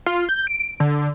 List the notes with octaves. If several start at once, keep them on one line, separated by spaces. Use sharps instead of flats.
F4
G6
D7
D3